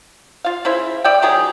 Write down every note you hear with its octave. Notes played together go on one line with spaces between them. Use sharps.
F4 F5
C#3 E4 C5 E5
D5 E5 G5
D#3 F#3 G4 G#4